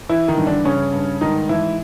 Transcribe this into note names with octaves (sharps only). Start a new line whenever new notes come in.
E3 E4
D#3 D#4
G2
D3 D4
G2 C#3 C#4
G2
G#2 D#3 D#4
G#2 E3 E4